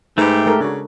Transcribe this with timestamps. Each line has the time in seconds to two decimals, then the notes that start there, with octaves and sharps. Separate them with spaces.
0.18 G#2 A3 D#4 G4 B4 A#5
0.46 G#3 A4 A#4
0.61 C#3 D4 F#4